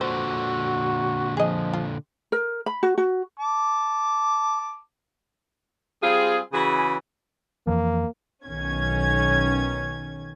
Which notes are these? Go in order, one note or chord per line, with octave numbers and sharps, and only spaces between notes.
A#2 D3 F#4 C5
F3 G#4 D#5
F4
A#4
B5
F#4
F#4
A5 D6
G3 C4 F4 G#4
C#3 E3 F#4 G#4 G#5 B5
F2 E3 F3 A#3
B1 D#3 C#4 G#6